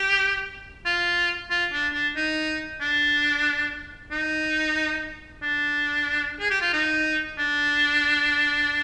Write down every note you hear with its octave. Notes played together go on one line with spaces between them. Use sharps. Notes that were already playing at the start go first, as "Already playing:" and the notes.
Already playing: G4
F4
F4
D4
D4
D#4
D4
D#4
D4
G#4
G4
F4
D#4
D4